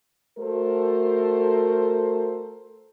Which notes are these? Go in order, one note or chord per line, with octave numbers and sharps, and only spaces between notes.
A3 F#4 A4 A#4 C5